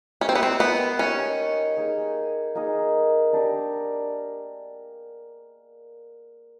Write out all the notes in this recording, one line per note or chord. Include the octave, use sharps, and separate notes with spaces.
A#3 C#4 D#4 G4 B4
C4
B3
C4
B3
A#3 C#4 D#4 G4 B4
A#3 D#4 G#4
A#3 D#4 G#4
D4 G4 A#4